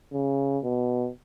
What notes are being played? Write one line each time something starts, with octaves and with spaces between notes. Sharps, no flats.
C#3
B2